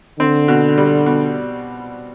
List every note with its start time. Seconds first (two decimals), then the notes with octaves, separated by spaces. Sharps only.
0.19 D3 C4
0.48 B2
0.78 G3
1.06 B2